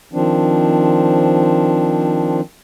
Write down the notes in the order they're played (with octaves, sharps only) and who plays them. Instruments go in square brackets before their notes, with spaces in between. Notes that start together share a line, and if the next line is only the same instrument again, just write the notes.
[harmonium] D#3 F3 C4 D4